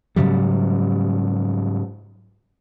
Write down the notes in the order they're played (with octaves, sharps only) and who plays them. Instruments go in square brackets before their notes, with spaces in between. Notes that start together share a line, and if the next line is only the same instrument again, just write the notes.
[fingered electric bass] G#2 C#3 F#3 G3